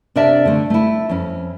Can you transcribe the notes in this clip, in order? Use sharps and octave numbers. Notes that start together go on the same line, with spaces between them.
C3 D4 A#4 D5 E5 A5
D3 A3
A3 E4
F2 C#4